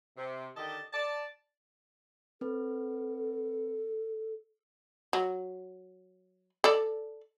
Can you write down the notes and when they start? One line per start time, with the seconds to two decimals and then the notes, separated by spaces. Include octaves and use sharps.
0.17 C3
0.56 D3 D#3 G4 A4 D#5 A5
0.93 D5 A5
2.41 C4 A4 B4
5.13 F#3
6.64 A4 D5